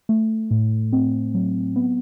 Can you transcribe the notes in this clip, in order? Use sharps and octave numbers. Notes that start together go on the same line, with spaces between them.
A3
A2
C4
F#3
B3